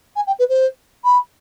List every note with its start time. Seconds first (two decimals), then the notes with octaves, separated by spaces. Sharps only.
0.16 G#5
0.27 G5
0.39 B4
0.49 C5
1.04 B5